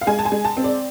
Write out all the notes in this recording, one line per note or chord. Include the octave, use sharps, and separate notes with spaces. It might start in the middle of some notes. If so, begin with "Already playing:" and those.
F5
G#3 G#5
A5
G#5
G#3
A5
C4
D5